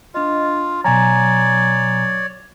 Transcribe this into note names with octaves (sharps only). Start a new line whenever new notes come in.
D4 F4 D#5
B2 F#3 C#5 D5 G#5 A#5